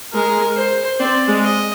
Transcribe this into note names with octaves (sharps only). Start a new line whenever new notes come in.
G#3 A#4
C5
C4 D5
G#3
D#5